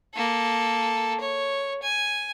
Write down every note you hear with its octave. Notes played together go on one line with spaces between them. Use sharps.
A#3 A4
C#5
G#5